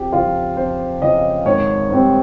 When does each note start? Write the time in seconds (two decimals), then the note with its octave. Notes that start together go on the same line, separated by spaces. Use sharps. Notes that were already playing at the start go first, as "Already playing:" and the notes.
Already playing: F2 G4
0.13 C#3 F3 F4
0.57 F2 C5
1.02 C#3 F3 D#5
1.46 G#1 C#5
1.90 G#2 G3 C4